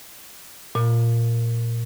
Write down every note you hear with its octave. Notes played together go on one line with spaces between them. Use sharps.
A#2